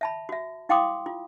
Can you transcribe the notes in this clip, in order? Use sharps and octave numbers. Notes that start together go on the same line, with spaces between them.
E5 A5 B5
F#4 E5
E4 F5 G5 C6 D6 D#6
F4